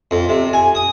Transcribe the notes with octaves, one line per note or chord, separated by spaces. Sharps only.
F2
C3
G#5
D#6